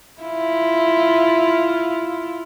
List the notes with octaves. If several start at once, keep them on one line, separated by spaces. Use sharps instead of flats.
E4 F4